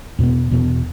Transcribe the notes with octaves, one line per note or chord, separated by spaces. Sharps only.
E2 B2 B3
E2 B2 B3